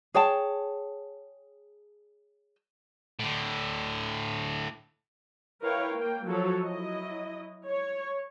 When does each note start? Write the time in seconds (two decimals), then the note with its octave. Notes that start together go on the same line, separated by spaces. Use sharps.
0.14 G#4 C#5 G5 A5
3.20 A2 D3
5.63 E4 A#4 B4 C#5 F5 G5
5.96 A#3 G5
6.26 F3 F#3 F#4 A4 C#5
6.64 F#3 E4 D#5
7.67 C#5